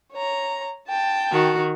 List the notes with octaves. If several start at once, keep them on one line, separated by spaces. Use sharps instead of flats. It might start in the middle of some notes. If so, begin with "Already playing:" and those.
C#5 A#5
G5 A5
D#3 F#4